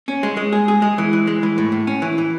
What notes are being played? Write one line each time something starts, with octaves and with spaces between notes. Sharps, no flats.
C#4
G#3
G#3
G#4
G#4
G#3
E3
E3
G#3
E3
A2
A2
C#4
E3
E3